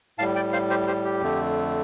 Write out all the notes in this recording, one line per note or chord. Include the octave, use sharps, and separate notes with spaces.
A2 G3 F5 A5
D5 G5
C5 F5
G4 C5
G4 C5
G4
F2 D3 A3